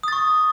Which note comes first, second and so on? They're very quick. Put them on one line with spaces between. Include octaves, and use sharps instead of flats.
D#6 A6 C#6